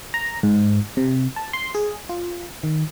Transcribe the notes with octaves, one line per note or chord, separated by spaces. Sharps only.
A#5
G#2
C3
A5
C6
G#4
F4
D#3